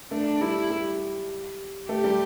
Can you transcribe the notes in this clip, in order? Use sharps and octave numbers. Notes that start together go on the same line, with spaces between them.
A3 D4
G3 E4
G3
A3 G4
G3